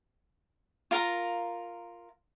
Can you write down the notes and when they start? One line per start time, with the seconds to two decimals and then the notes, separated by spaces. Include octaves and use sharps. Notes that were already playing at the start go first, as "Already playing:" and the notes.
0.91 F4 A#4 F5 A#5